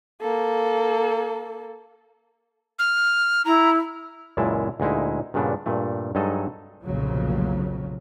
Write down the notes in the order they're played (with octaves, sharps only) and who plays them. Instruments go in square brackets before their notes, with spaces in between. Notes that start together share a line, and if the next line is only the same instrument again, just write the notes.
[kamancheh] A#3 A4
[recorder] F6
[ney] E4 [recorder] A#5
[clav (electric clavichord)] C#2 F#2 A#2 G#3 E4 A5
D2 A#2 G#3 D#4 E4
G2 A#2 C#3 B3 D4
G2 A#2 A3
G2 F#3 G#3 D#4 A4 D#5
[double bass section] F1 B1 F2 A#2 C#3 F#3